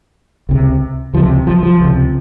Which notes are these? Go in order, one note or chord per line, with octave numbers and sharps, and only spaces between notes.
C#2 C3
C#2 C3 F3
F3
F3
C#2 C3